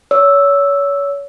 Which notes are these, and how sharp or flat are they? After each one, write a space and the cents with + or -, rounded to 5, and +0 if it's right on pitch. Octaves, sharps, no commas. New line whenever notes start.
C#5 +30 E6 +0